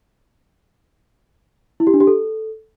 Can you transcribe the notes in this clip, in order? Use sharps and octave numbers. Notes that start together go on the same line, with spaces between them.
E4
G4
D4
G4
A4